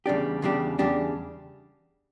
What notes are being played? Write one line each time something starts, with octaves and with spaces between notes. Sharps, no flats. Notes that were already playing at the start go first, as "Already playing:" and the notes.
E2 C#3 G3 D4 G4
E2 C#3 G3 D4 G4
E2 C#3 G3 D4 G4